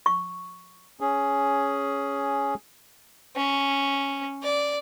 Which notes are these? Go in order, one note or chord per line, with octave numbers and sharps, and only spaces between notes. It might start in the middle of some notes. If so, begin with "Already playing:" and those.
C#6
C#4 G#4
C#4
D5